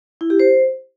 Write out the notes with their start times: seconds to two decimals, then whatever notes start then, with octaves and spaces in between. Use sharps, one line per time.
0.21 E4
0.30 G4
0.40 C5